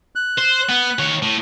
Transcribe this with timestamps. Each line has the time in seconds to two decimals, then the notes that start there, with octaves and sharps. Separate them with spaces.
0.15 F#6
0.39 C5
0.69 B3
0.99 D#3 C#5
1.22 A2